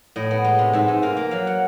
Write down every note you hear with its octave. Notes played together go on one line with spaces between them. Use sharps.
A2 D#5
B3
G#3
C3
G#2 E5
G#2
A#3 F5
A#3
F#3 F5
F#5